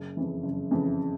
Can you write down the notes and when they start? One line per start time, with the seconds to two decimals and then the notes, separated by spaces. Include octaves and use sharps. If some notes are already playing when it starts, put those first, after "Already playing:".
Already playing: F#1
0.17 F2 C#3 E3
0.43 F#1
0.71 F2 C#3 E3